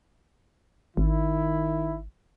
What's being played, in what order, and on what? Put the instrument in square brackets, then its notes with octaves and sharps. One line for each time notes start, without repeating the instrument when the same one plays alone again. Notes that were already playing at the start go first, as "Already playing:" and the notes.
[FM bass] G#1 [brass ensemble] D#3 E4